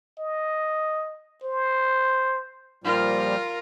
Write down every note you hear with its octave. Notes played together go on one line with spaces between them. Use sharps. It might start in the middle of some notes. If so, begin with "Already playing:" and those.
D#5
C5
A#2 F3 G3 F4 A#4